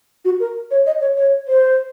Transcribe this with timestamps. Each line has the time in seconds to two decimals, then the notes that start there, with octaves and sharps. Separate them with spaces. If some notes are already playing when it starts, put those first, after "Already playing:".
0.25 F#4
0.40 A#4
0.71 C#5
0.86 D#5
1.01 C#5
1.17 C#5
1.48 C5